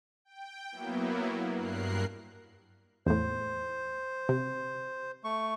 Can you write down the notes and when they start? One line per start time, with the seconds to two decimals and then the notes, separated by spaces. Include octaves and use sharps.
0.25 G5
0.72 F#3 A#3 B3 E4
1.52 G2 A#4 F#6 C7
3.06 E2 A2 C5
4.29 C3
5.24 A3 C#6